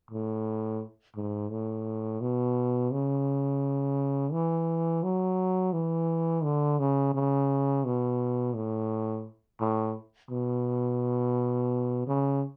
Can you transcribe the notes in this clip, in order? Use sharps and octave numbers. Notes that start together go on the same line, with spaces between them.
A2
G#2
A2
B2
C#3
E3
F#3
E3
D3
C#3
C#3
B2
A2
A2
B2
C#3